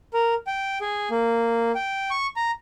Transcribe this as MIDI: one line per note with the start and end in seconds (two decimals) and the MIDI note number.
0.14 0.34 70
0.47 0.78 79
0.81 1.09 68
1.11 1.72 58
1.75 2.10 79
2.11 2.27 85
2.36 2.51 82